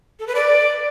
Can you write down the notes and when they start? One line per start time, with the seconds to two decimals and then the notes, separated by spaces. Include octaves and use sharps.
0.20 A4
0.27 B4
0.35 D5